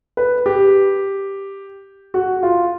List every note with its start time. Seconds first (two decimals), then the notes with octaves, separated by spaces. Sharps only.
0.17 B4
0.46 G4
2.14 F#4
2.43 F4